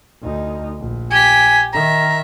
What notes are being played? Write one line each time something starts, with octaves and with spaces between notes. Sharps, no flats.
D2 D#4
A#1
G4 G#5 B6
D#3 E5 A#5